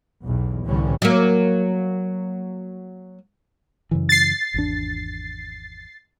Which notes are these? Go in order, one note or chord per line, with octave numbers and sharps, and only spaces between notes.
B1 E2
C2 A2 D3 E3 G3 C#4
F#3 A#3
F#2 C#3 E3
A6 C7
G#1 E2 D4